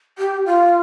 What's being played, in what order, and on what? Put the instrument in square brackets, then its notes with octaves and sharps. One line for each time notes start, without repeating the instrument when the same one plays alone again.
[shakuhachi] G4
F4